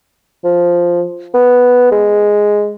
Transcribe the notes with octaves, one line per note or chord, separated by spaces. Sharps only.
F3
B3
G#3